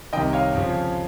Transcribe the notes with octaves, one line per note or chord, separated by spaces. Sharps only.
C2 C3 D#3 D#5 G5
C#5 F5
F2 C#3 F3